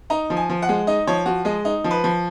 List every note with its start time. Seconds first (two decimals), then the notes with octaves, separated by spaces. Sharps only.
0.10 D#4 A#5
0.30 F3
0.37 G#5
0.50 F3
0.62 F#5
0.69 G#3
0.87 D#4 D#5
1.07 F3 C#5
1.26 F3 F#4
1.45 G#3 D#5
1.65 D#4
1.84 F3
1.91 B4
2.04 F3